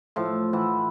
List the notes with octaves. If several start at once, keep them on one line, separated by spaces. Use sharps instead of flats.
A2 F3
E3 E5 F#5